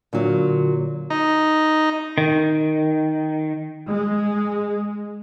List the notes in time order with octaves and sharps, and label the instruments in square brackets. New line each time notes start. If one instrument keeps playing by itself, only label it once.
[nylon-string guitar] A#2 F#3 [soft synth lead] D3
[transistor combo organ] D#4
[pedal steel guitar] D#3
[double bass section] G#3